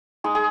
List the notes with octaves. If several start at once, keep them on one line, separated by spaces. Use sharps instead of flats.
G#3 D#4 G#4
G#4